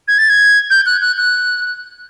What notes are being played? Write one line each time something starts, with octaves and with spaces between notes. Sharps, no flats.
G#6
A6
G#6
G6
F#6
F#6
F#6